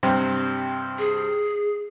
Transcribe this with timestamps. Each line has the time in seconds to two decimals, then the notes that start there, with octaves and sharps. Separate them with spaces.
0.03 G2 C3 C4
0.99 G#4